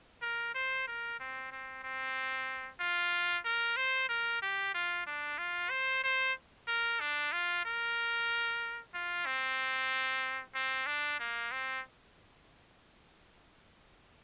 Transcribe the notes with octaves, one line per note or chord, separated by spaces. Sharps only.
A#4
C5
A#4
C4
C4
C4
F4
A#4
C5
A#4
G4
F4
D4
F4
C5
C5
A#4
D4
F4
A#4
F4
C4
C4
D4
A#3
C4